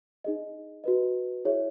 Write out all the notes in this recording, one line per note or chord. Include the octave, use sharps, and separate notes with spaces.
D#4 G#4 D#5
F#4 B4 D#5
E4 G#4 C#5 E5